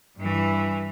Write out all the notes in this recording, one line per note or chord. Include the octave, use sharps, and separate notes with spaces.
G2 E3